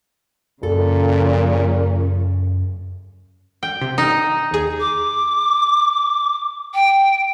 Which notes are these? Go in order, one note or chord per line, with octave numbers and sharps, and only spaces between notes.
F#2 A#2 C#3 F3 C#4 A4
G5
C3
D#4
D#2 G#4
D6
G5